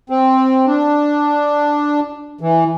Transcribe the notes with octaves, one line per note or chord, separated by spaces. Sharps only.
C4
D4
E3